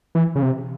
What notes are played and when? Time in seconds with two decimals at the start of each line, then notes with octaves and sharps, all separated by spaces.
0.15 E3
0.36 C#3
0.42 C3